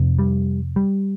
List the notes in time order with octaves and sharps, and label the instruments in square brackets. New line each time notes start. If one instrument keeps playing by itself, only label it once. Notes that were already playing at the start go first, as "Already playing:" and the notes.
Already playing: [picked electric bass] F2 C3
G3
G3